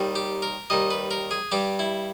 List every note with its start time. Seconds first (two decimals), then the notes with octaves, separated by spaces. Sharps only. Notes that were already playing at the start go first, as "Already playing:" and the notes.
Already playing: D#2 D#3 G3
0.15 G4
0.42 A#4
0.70 D#2 D#3 G3 D#5
0.91 B4
1.11 A#4
1.31 G#4
1.52 G2 G3 G4
1.79 E4